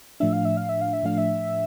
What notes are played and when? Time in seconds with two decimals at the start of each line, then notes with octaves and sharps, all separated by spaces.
0.20 A2 F3 A3 D4 E5
0.33 F5
0.45 E5
0.57 F5
0.69 E5
0.81 F5
0.93 E5
1.03 A2 F3 A3 D4 F5
1.18 E5